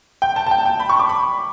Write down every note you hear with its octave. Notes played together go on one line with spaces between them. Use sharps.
G5
A5
A5
G5
G5
B5
C#6
D6
B5